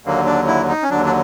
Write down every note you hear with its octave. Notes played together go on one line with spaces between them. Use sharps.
D#2 D3 F#3 A#3
D4
E4
D#4
C#4
D#2 D3 F#3 D4
D4